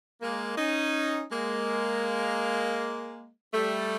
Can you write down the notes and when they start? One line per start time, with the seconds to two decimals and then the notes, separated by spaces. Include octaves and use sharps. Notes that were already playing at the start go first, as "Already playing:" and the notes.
0.21 G#3 A#3
0.58 C#4 D#4
1.32 G#3 A#3
3.53 G3 A3